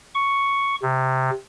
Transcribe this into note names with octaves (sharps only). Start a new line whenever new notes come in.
C#6
C3